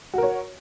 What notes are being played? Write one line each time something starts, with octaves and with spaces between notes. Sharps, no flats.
F#4 A#4 C#5